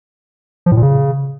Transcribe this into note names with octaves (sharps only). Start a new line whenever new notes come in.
F3
A2
A#2
C#3